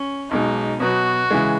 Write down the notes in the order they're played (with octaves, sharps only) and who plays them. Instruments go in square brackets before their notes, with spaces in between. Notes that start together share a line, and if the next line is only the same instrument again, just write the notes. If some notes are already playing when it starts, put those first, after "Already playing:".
Already playing: [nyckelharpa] C#4
[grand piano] B1 B2 G#3 [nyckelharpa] D#4
[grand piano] B2 F#3 B3 [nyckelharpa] F#4
[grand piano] C#3 E3 G#3